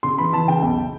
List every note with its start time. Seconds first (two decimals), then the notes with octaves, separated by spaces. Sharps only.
0.03 C#3 C6
0.18 E3 B5
0.33 E3 A5
0.48 C#3 G5
0.62 B1